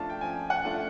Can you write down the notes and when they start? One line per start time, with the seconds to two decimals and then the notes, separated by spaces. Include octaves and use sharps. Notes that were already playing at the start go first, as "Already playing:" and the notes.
Already playing: F3 A3 D4 F4 A5
0.10 G5
0.21 F3 G#5
0.50 F#5
0.65 A3 D4 F4